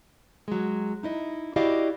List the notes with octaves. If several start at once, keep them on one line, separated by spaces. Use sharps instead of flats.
F#3 G#3
D#4 E4 D#5
E4 F#4 G4 D5 D#5 F5